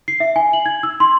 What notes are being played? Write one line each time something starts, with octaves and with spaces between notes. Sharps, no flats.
C7
E5
G#5
F#7
G#6
E6
C6